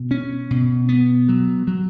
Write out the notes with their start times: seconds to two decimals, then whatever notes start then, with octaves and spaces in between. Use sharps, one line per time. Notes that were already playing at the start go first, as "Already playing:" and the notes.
Already playing: B2
0.11 C#4
0.51 B2
0.89 B3
1.28 F#3
1.67 F#3